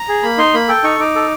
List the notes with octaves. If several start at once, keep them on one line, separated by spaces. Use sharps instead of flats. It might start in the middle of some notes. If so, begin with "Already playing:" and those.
Already playing: A#5
G#4
A#3 B5
D#4 C6
A#3 B5
A4 G5
D#4 C#6
D#4 D6
A4